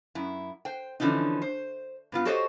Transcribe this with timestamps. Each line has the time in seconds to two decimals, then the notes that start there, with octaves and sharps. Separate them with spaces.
0.15 F#2 E4
0.65 C5 G5
1.00 D3 E3 F3 C#4 D#4
1.42 C5
2.12 G2 B3 F4
2.25 F#4 G4 A4 C5 C#5 D#5